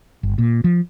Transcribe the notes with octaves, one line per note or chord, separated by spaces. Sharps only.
G1
A#2
F3